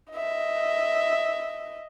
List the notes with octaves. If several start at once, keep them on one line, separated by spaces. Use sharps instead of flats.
D#5 E5